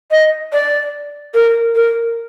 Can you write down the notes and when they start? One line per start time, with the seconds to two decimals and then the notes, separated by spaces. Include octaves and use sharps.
0.11 D#5
0.53 D5
1.34 A#4
1.75 A#4